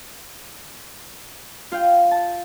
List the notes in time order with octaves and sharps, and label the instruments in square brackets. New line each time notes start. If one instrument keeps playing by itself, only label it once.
[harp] F4 F5 G5
A5